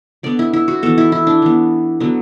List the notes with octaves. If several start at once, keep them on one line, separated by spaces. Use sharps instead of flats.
D3 B3 D5
E4
E4
F#4
E3 B3 A4
E4
E4
D4
E3 B3
D3 F#3 B3